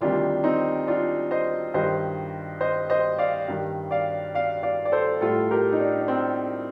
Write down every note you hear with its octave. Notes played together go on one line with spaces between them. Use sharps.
D2 C3 D#3 G3 D4 F4
C4 D#4
D4 F4
C5 D#5
G2 D#3 G3 C5 D#5
C5 D#5
C5 D#5
D5 F5
G2 D#3 G3
D5 F5
D5 F5
D5 F5
D5
A4 C5
A2 G3 F4 A4
G4 A#4
D#4
D4
D4
C4